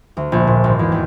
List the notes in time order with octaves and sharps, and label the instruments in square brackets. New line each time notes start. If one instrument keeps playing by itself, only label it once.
[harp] D2
A#1
A#2
G#1
E2
D#2